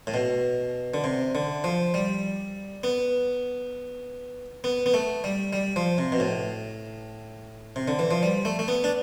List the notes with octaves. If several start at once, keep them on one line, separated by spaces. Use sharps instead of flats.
A2
B2
D3
C3
D3
F3
G3
B3
B3
B3
A3
G3
G3
F3
C3
B2
A2
C3
D3
E3
F3
G3
A3
A3
B3
D4